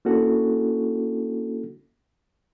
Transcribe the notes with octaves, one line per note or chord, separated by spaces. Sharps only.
A#3 C#4 D4 E4 F#4 A4